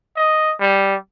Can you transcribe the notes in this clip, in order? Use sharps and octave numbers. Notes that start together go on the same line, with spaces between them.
D#5
G3